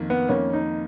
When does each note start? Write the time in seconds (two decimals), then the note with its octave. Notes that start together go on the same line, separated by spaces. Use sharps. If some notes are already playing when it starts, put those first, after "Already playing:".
Already playing: F2 D#3 A#3
0.10 B3
0.29 F2 D#3 A#3 C#4
0.53 D#4